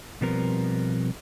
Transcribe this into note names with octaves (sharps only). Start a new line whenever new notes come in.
B2 F3 G3 B3 C4 A#4